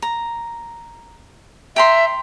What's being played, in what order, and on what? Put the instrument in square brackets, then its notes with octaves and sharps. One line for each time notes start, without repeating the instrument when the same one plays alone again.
[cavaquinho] A#5
[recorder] E5 [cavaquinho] G5 A#5 C6